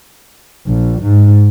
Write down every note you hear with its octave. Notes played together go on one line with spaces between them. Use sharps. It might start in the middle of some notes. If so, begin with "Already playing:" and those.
A#1
G#2